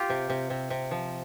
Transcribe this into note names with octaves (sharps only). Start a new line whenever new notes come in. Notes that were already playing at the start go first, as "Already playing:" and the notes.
Already playing: F4 G4
C3
C3
C3
C3
F3